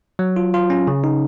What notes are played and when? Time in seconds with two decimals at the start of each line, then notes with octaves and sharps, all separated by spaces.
0.19 F#3
0.36 F4
0.54 F4
0.70 C#4
0.87 C#3
1.04 D#4